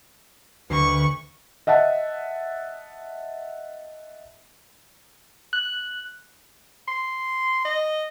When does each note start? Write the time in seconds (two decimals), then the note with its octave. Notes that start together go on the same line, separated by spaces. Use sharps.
0.70 D2 B4 C#6
1.67 D#5 E5 F#5 A5
5.53 F#6
6.88 C6
7.65 D#5